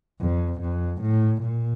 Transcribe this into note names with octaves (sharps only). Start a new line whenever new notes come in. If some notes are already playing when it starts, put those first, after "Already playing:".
F2
F2
A2
A#2